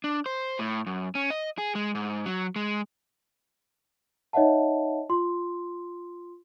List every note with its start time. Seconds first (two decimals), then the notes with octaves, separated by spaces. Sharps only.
0.04 D4
0.26 C5
0.59 A2
0.86 F#2
1.15 C#4
1.30 D#5
1.58 G#4
1.75 G#3
1.95 G#2
2.26 F#3
2.56 G#3
4.33 D#4 C#5 D#5 E5 F#5 A5
5.09 F4 C6